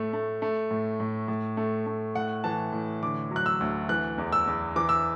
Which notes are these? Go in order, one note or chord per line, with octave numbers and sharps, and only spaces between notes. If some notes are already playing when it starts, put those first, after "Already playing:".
Already playing: A2 A3
A3
A3
A2
A2
A2
A3
A3
A2 F#5
E3 A5
A2
D3 D6
F#3
F#6
E6
D2
E3 F#6
E2
E6
E2
E3 D6
E6